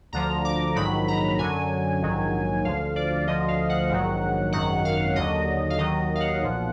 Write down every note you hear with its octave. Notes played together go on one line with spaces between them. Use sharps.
D2 D3 F3 A#5
D6
A#1 G#2 D#3 F#3 B5
A#5
F#2 D3 F#3 G#5
A#1 G#2 D#3 F#3
D2 D3 F3 F5
D5
D2 D3 F3 D#5
F5
F#5
A#1 G#2 D#3 F#3
G#1 F#2 D#3 F#3 F#5
F5
D#2 D3 F#3 D#5
F5
D#2 D#3 F#3 D#5
F5
F#5
B1 A#2 F3